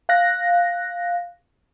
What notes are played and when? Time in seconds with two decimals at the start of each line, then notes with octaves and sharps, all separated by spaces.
0.09 F5 F#6 A#6